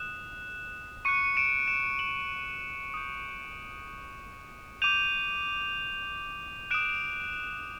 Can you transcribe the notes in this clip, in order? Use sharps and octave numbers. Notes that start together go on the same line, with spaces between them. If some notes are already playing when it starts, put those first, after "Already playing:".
Already playing: D#6 F#6 E7
C#6 F#6 C#7 D#7
D7 E7
D7 E7
E7 F#7
D#6 G6
D6 G6 D#7 F7
D#6 F#6 D7 E7